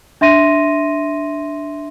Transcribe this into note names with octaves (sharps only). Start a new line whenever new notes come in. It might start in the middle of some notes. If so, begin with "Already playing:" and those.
D4 E5 C6 A#6 D#7